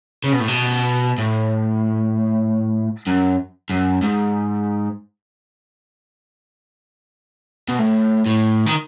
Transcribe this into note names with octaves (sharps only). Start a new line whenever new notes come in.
C#3
B2
A2
B2
A2
F#2
F#2
G#2
B2
A2
A2
D#3